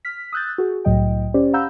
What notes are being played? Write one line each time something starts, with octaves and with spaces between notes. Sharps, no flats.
F6 B6
D#6 E6 F#6 G6 A6
F#4 G#4
C2 A2 F#3 D#5 G5
C#4 G4 C5 D5
F5 F#5 A#5 B5 E6 G6